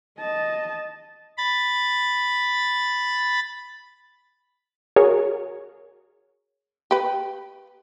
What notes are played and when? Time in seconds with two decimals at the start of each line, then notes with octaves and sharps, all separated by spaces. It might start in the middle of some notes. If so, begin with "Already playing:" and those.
0.18 D#5 A5
1.38 B5 A6
4.96 F#4 G#4 A#4 C#5
6.91 G4 B4